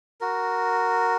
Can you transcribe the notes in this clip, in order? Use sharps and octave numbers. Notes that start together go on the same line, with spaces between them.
F#4 A#4